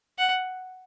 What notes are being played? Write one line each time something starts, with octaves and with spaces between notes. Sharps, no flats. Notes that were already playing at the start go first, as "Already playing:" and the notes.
F#5